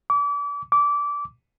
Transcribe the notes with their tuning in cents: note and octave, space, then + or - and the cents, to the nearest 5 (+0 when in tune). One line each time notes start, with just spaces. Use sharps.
D6 -35
D6 -20